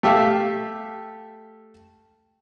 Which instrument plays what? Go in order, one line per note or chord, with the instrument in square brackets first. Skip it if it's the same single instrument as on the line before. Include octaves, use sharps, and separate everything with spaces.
[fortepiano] A3 G4 E5 F5